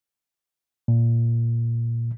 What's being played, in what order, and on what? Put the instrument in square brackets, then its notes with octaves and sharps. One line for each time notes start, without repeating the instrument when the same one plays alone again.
[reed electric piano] A#2